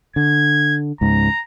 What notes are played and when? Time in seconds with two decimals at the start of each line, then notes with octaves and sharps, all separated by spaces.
0.16 D3 G#6
1.01 C#2 G#2 A#5